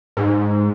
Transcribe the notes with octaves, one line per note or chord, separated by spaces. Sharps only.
G#2